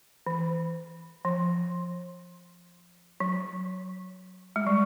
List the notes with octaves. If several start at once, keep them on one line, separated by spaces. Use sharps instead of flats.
E3
F3
F#3
G#3
G3